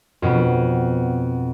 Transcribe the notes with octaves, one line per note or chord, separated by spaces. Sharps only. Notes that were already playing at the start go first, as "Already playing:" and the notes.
F2 B2 B3